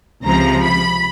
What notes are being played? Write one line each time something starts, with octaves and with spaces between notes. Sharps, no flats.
C#2 C3 F3 A#5
B5